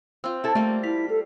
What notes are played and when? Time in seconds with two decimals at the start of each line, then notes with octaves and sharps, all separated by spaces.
0.24 C4 F4 E6
0.44 E4 A4
0.55 G3 A3 A#3 C4
0.83 E4 F5 B6
1.10 A4